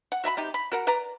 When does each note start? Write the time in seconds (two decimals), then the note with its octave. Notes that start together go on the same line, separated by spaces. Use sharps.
0.12 F#5
0.24 F#4 E5 A#5 B5
0.37 C3 D#4 G4
0.54 B5
0.72 F#4 A#4 F#5
0.87 B4 D5 A#5